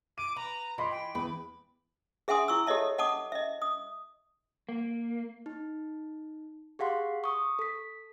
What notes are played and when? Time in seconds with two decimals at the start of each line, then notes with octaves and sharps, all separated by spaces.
0.18 D6 D#7
0.36 B4 A#5
0.78 E3 D#5 B5 C6
0.91 G5
1.15 E2 B4
2.28 G#4 E5 F#5 G#5 C6 D#6
2.48 E4 C#6 E6
2.67 G4 A4 C#5 D#5 E5 A5
2.98 D#5 F#5 A5 D6 D#6
3.32 D#5 E5
3.62 D#6
4.69 A#3
5.46 D#4
6.79 G4 G#4 F5 F#5 C6
7.24 C#6 D#6
7.59 A4 B6